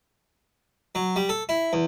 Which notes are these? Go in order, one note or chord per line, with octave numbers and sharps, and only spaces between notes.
F#3
G3
A4
E4
E2